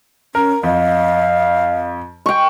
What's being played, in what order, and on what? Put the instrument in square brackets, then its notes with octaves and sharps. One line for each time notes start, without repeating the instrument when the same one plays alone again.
[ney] C#4 [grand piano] A#4
[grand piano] F2 [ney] D#5 [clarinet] F5
[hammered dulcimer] G5 C#6